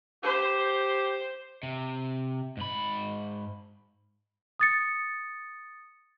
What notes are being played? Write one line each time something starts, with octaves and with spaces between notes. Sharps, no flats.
G4 C5
C3
G#2 B5
D#6 A6 C#7